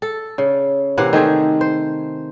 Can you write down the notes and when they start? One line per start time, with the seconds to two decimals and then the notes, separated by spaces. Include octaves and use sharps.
0.02 A4
0.38 C#3
0.98 C3 E3 A#3 F#5
1.13 D#3 A3 G#4 C5
1.61 C5